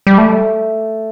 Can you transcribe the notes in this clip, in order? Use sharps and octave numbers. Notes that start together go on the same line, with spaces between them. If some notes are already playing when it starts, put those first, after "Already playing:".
G3
A3